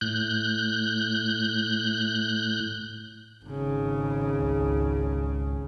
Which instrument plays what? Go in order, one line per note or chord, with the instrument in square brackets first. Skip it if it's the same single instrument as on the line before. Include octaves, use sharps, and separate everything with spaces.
[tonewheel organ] A2 F#6 G6
[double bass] G#1 C#3
[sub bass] C#2